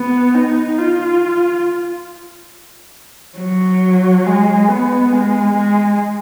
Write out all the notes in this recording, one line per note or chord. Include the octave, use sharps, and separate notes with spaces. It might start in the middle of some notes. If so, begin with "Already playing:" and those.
Already playing: B3
D#4
F4
F#3
G#3
B3
G#3
G#3